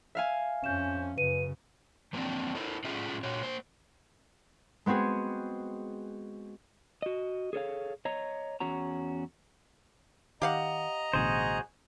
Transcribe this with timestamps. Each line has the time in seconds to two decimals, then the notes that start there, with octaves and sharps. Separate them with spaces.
0.15 E5 F5 G#5
0.64 F2 C#4 G6 E7
1.17 F#2 C#3 B4 D#7
2.13 E3 F3 A#3 C4 D4
2.55 E4 A4 A#4 C5
2.84 A2 A3 C#4 F4 G#4 E5
3.23 A#2 F#4 C#5
3.43 A#3 C5
4.86 G#3 B3 C4 F#4 G#4
7.02 F#4 D#5
7.53 G#4 A4 C#5 F5
8.05 C#5 D#5 A#5
8.60 E2 C#4 F#4 A#5
10.42 D#3 G4 D#5 F5 F#5 A#5
11.13 A1 B2 D3 F#4 G#4 C5